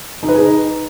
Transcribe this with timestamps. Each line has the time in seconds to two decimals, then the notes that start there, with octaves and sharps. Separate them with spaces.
0.23 D#4
0.29 B4
0.34 G#4
0.40 D#4